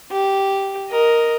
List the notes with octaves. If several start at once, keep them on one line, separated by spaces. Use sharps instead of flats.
G4
A#4 D#5